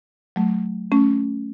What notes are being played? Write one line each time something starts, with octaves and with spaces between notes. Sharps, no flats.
F#3 A3
A3 C#4